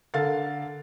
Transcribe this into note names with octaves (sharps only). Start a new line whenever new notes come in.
D3 A4 A#4 F5 A6